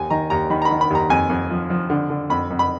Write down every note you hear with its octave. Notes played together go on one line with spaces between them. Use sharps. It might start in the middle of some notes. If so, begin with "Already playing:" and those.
Already playing: D#2 G#5
D#3 A#5
D#2 A#5
D#3 B5
A#5
B5
D#3
B5
D#2 A#5
F2 G#5
F2
F3
F3
D3
D3
F2 B5
F2
B5